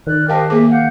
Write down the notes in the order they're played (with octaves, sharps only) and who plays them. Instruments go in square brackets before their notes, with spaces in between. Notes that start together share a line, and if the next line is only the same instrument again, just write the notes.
[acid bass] D#3 [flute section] D5 F6 F#6
[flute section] G4 C5 D#5 [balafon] A#4 F5 A5
[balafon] A#3 G#4 D6 [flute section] E5
[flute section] F5 F#5 G6